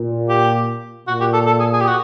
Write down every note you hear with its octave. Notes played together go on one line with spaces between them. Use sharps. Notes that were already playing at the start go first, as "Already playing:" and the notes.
Already playing: A#2
G4
A#2 F#4
G4
A4
A4
G#4
G#4
G4
F#4